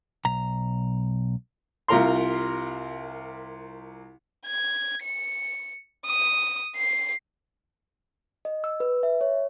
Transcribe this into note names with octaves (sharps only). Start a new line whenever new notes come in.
B1 A#5
C2 C3 F4 A#4 A#5 C6
G#6
C#7
D#6
C7
D#5
E6
B4
E5
C#5